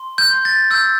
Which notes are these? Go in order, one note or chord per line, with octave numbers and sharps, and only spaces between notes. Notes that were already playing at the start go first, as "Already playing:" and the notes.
Already playing: C6
G6
C6
A6
E6 G6